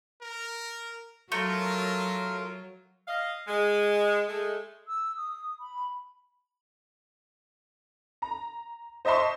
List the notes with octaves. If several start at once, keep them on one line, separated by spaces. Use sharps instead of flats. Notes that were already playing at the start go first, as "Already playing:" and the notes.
A#4
F#3 A3 F4 A#4
D#5 F5
G#3
G#3 A3
E6
D#6
B5
A#5
C5 D#5 E5 A5 C6 C#6